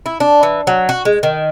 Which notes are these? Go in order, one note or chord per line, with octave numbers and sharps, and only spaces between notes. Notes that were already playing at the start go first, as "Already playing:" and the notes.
E4
D4
E3
F#3
F#4
G#3
D#3